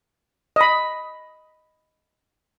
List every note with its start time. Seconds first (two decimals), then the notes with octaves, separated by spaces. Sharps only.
0.56 D#5 B5